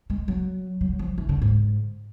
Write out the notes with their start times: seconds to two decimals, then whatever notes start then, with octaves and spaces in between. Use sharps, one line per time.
0.10 G#3
0.28 F#3
0.81 F#3
0.99 F3
1.18 E3
1.29 D3
1.42 G#2